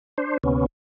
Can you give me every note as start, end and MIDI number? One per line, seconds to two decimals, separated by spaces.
0.18 0.37 62
0.18 0.37 72
0.43 0.66 38
0.43 0.66 48
0.43 0.66 59
0.43 0.66 61